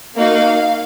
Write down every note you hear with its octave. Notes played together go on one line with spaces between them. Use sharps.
A#3 D#4 F#4 F5